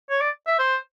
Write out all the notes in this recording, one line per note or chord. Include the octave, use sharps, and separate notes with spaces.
C#5
D5
E5
C5